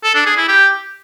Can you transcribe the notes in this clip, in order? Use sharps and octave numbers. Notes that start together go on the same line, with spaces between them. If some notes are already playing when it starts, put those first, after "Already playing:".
A4
D4
G#4
E4
G4